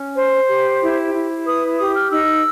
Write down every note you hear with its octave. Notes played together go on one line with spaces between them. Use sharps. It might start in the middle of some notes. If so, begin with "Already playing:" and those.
Already playing: C#4
C5
G4
E4
E4
B4 D#6
G4 D#6
F6
D#4 E6